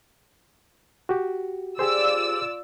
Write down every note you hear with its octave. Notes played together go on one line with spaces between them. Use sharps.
F#4 G4
F4 G4 G#4 C5 D5 E6